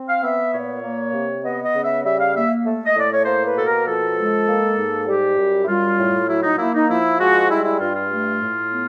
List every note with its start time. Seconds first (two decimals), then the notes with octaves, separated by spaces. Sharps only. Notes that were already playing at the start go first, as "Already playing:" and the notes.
Already playing: C4
0.08 F5
0.22 B3 E5
0.54 A#2 C#5
0.83 A#3
1.13 C3
1.43 B3 D#5
1.64 D#5
1.74 C#3
1.84 E5
2.04 G3 E5
2.19 F5
2.35 A#3 E5
2.65 A3
2.85 D#5
2.95 A2 D5
3.13 C#5
3.25 A#3 C5
3.45 B4
3.56 B2 A4
3.65 A#4
3.86 F3 A4
4.17 G#3
4.47 A#3
4.77 G#2
5.07 G3 G4
5.37 F#2
5.63 E4
5.68 G3 F4
5.99 A2
6.28 F#3 E4
6.43 D#4
6.58 A#3 E4
6.74 D#4
6.89 F3 E4
7.19 G#3 F#4
7.50 G3 E4
7.64 E4
7.80 G2 F4
7.95 F4
8.10 A3
8.41 A2
8.71 B3